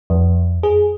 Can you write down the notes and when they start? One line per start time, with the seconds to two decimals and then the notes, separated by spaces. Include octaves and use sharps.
0.10 F2
0.63 G#4